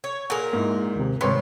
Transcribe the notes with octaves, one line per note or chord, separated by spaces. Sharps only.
C#5
A#2 G#4 A#4 F#5
G#2 A#3 E4
D#2 C3
G#1 C3 C#5 B5 C6